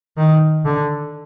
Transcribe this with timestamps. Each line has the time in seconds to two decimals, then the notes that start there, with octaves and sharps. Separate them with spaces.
0.17 D#3
0.65 D3